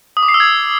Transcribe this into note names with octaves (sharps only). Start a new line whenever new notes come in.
D#6
D6
C7
E6
G#6